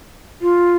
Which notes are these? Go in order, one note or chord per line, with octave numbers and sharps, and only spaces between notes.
F4